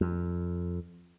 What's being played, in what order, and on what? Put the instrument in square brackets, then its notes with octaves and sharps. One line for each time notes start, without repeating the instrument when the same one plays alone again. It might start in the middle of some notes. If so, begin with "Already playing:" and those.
[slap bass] F2